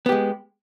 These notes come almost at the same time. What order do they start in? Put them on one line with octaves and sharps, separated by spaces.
B3 G4 G#3